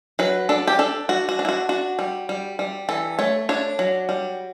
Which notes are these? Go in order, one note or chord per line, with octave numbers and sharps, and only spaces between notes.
F#3 B4
D4 A4
G4
D4 A4
D4 F#4
F#4
D4
E4
F#4
D4 F#4
G3
G3
G3
E3 A4
A3 C#5
D4 C#5
F#3
G3